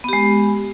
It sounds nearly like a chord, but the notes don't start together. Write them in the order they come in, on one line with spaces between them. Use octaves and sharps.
B3 G4 G#3